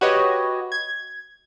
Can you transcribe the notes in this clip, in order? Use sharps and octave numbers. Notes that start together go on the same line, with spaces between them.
F#4 G4 B4 C#5 D#5
G#6